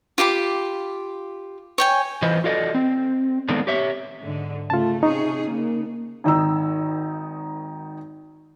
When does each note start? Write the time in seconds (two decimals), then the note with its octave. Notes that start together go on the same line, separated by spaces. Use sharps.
0.18 F4 G4 B5 D6
1.78 C#5 G5 G#5
2.22 E3 F4 B4 C5 D#5
2.44 F4 F#4 A4 D5 D#5
2.74 C4
3.49 D#3 G#3 A3 B3 C4 D4
3.67 G4 C#5 E5
4.19 G#2 D3
4.70 C#3 A3 F4 A5
5.03 C3 C#4 D#4 G#4 C#6
5.48 C#3 A#3
6.24 G#1 D#3 D#4 E6